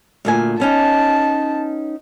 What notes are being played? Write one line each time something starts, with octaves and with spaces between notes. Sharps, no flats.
D2 A#2 G#5
B3 C#4 D#4 A5